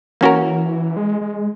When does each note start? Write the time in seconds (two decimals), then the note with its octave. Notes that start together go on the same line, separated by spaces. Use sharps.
0.21 E3 A#3 C#4 F#4 A#4
0.97 G#3
1.21 G#3